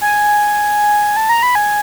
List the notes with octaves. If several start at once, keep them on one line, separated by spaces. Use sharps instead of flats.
G#5
A5
A#5
B5
G#5